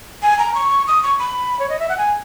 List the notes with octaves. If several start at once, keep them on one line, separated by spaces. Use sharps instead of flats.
G#5
A#5
C#6
D#6
C#6
B5
C#5
D#5
E5
F#5
G#5